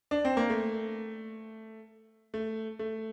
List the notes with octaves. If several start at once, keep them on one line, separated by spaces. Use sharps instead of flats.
D4
C4
A#3
A3
A3
A3